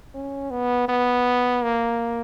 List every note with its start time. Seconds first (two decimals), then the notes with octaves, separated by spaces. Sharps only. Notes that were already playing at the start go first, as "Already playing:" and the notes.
0.14 C#4
0.51 B3
0.88 B3
1.63 A#3